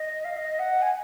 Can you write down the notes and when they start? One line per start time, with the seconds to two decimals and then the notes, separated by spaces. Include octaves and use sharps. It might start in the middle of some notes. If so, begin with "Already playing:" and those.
Already playing: D#5
0.24 F5
0.36 D#5
0.59 F#5
0.81 G#5